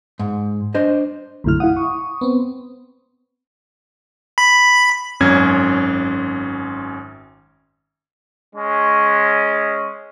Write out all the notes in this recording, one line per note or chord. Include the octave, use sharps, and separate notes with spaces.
G#2
D4 C5 D#5
B1 F#2 D3 A3 E4 F6
E4 F5 F#5 D#6
C#6
B3 C4
B5
G#1 F#2 C#4 G#6
G#3 C#4